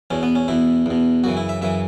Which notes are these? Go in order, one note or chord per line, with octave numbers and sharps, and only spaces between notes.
E2 B2 C#4
B3
C#4
E2 B2 E4
E2 B2
F#2 C#3 E3 F#4
E4
E5
F#2 C#3 E3 E5